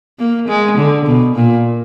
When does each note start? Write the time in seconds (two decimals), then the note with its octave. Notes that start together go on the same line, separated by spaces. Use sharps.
0.19 A#3
0.48 G#3
0.78 D3
1.06 B2
1.35 A#2